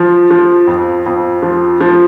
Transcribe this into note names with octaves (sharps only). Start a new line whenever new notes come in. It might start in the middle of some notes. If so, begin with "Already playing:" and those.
Already playing: F3
F3
F2
F2
F3
F3